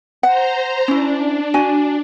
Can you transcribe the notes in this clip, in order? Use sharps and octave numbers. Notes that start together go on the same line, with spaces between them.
C5 F#5 A#5
C#4 D4 E4
F#4 G#5